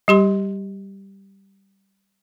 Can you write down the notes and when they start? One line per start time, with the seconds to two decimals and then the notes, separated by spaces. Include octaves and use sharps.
0.08 G3 G4 C6